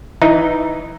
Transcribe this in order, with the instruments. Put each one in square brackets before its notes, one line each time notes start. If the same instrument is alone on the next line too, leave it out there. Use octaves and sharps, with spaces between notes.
[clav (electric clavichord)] E3 D#4